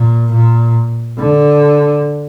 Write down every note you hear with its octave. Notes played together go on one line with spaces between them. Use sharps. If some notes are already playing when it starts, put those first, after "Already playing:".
Already playing: A#2
A#2
D3